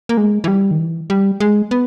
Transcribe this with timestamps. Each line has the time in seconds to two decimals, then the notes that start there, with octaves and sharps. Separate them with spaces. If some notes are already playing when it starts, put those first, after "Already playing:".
0.09 A#3
0.17 G#3
0.44 E3
0.48 G3
0.71 D#3
0.79 E3
1.10 G3
1.40 G#3
1.71 B3